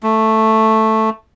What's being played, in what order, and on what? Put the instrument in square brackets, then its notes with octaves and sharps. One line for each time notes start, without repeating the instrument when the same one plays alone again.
[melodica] A3